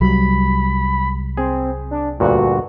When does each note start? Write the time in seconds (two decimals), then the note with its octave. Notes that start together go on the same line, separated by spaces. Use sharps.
0.01 C2 F#3 G3 B5
1.37 C4 G#4
1.91 D4
2.20 D2 G2 A#2 F#4